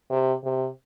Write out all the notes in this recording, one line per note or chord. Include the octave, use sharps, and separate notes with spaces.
C3
C3